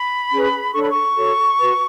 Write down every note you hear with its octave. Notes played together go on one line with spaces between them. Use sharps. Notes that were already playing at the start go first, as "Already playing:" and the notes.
Already playing: B5
C#4 G#4 B4
D4 A4 C#5 C#6
B5
C#6
F#4 A4 C#5
F#4 B4